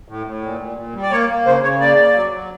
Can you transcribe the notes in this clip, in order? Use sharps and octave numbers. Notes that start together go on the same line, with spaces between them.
A2
A2
A#2
A#2
A#2
G3
D5
A#3 C#5
A#3
C#3 C5
C#3 C#5
A#3 D5
A#3
F#3
F#3